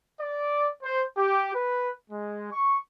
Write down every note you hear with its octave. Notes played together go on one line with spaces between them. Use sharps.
D5
C5
G4
B4
G#3
C#6